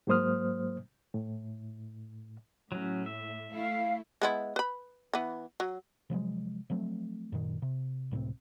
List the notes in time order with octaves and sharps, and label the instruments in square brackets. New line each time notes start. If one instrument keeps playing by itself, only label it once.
[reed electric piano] G#2 F#3 A#3 C5 D#6 F6
A2
[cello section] A2 [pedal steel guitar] F#3 C#4
[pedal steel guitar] E5
[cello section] A3 E4 [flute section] F5
[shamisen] G#3 B3 E4
B4 B5
E3 B3
F#3
[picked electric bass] C3 F3 F#3 G#3
F3 F#3 A3 C4
F#2 A#2 D#3
C3
C#2 A2 C3 C4